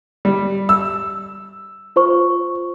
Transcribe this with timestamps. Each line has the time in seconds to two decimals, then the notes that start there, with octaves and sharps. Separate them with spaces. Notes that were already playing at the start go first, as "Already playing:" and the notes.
0.25 G3
0.69 E6
1.96 F4 C5 C#6